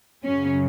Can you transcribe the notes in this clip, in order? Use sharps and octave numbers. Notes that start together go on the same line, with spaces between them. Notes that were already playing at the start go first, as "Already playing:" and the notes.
F#2 C#3 F#3 C#4